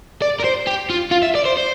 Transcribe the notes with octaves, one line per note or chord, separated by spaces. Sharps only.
D5
A#4
C5
G4
F4
F4
E5
D5
C5
C5